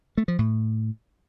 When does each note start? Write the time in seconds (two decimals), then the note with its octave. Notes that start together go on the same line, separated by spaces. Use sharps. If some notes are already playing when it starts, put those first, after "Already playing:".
0.18 A3
0.28 F3
0.39 A2